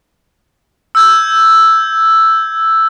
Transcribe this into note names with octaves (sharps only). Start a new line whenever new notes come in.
E6 G6 G#6